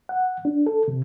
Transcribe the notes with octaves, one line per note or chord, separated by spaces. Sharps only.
F#5
D4
A4
C3